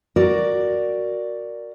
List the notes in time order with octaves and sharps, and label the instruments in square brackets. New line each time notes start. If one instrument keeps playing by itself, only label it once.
[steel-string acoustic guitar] F#4 A#4 D5